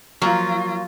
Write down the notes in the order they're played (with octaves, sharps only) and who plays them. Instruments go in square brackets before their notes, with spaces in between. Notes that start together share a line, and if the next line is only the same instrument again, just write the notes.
[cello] F3 F4 [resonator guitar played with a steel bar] F#3 A#3